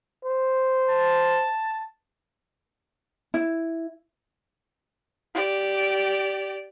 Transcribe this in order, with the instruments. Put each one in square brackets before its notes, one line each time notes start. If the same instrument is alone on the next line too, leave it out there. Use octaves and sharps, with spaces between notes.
[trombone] C5
[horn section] A5
[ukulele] E4
[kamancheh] G4 D5